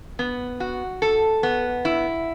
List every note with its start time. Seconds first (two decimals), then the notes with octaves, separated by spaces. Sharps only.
0.19 B3
0.60 F#4
1.02 A4
1.43 B3
1.85 E4